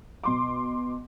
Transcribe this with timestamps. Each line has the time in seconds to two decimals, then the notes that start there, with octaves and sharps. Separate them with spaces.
0.24 B2 C6 D6